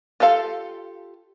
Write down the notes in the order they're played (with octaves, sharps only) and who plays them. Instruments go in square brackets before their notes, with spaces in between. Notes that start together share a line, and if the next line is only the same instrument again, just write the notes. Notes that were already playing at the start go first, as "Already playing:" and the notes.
[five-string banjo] F4 G4 A4 F5